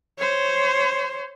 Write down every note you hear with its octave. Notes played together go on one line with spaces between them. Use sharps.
C5 C#5